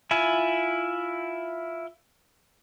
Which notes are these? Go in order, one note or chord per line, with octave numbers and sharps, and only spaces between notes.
E4 F4 G#5